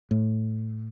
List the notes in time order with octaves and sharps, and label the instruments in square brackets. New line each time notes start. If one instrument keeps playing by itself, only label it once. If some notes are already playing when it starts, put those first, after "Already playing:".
[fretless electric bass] A2